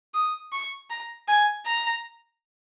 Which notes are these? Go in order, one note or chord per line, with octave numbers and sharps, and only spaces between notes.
D#6
C#6
A#5
G#5
A#5